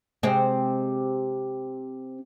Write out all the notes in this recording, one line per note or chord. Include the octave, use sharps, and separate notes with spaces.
C3 G#3 C4